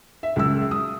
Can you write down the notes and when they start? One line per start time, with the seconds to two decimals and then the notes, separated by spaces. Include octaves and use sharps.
0.23 E5
0.36 C#2 F#2 E6
0.71 D#6